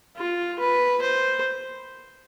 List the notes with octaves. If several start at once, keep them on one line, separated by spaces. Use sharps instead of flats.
F4
B4
C5